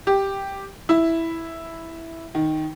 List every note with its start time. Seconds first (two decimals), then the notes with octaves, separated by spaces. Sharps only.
0.07 G4
0.89 E4
2.35 D#3